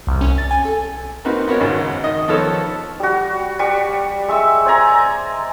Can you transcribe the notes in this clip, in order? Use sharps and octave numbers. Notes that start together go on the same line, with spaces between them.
C2
C#4
A6
G#5
A4
A#3 C4 D#4 F#4 B4
B3 F#4 A#4 C#5
G#1 G#2 C#3 F#4
D#3 D#5
D#3 F3 B3 A4 C#5
G3 F#4
G3 C#6
G#3 E5 C#6 E6
C5 D5 G#5 A#5